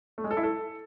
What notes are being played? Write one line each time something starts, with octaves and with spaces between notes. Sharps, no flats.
A3
G#3
A4
E4
A4